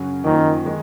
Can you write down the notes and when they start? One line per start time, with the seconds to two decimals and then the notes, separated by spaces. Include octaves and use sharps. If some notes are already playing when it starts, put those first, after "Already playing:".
Already playing: F#2 C#3 F#3 C#4 F#4
0.24 F#2 D#3 F3 A#3
0.65 D#3 G#3